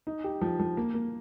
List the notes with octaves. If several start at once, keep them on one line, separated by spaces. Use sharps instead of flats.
D#4
G4
F3
F3
A#3
A#3